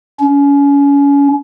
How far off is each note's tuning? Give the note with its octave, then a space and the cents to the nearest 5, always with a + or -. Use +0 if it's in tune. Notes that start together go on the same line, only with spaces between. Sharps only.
C#4 +30